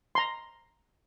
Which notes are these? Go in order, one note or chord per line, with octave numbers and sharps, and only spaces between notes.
A#5 C6